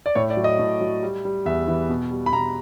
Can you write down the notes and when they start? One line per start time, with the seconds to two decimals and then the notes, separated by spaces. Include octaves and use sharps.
0.06 D5
0.15 A2 C#5
0.30 D5
0.37 F#3
0.44 D#5
0.59 A2
0.81 F#3
1.03 G3
1.25 G3
1.45 E2 E5
1.67 E3
1.89 B2
2.11 G3
2.26 B5
2.33 B2 A#5